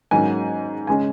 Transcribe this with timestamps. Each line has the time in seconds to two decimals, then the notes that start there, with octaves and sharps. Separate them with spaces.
0.11 G#2 F#3 A#3 C#4 G#5
0.87 C#3 G#3 C#4 G#5